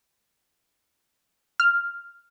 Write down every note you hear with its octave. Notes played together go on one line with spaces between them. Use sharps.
F6